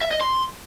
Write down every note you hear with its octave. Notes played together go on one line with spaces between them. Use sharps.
E5
D#5
C6